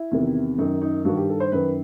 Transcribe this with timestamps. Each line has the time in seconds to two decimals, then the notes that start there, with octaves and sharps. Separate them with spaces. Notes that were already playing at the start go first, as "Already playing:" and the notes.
Already playing: E4
0.11 E2 C3 D#3
0.58 F#2 D#3 D#4
0.82 D#4
1.05 G2 D#3 F#4
1.17 G4
1.29 A4
1.40 C5
1.52 F#2 D#3 B4